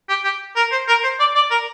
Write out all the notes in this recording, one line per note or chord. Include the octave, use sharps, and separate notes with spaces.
G4
G4
A#4
C5
A#4
C5
D5
D5
A#4